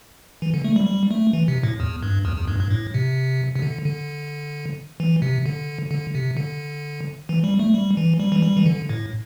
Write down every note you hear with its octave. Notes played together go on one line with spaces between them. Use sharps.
E3
D3
A3
G3
G3
A3
E3
C3
A2
E2
G2
E2
E2
G2
G2
A2
C3
C3
D3
D3
E3
C3
D3
D3
C3
D3
E3
G3
A3
G3
E3
G3
E3
G3
E3
D3
A2